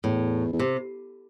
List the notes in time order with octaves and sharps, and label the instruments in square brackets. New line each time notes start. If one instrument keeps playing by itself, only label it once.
[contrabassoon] E2 [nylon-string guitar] A2
[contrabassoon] E2
[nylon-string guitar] C3